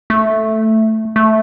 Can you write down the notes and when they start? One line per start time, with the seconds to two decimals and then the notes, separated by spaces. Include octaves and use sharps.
0.10 A3
1.16 A3